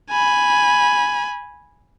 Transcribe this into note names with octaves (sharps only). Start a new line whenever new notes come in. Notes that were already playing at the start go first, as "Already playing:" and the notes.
G#5 B5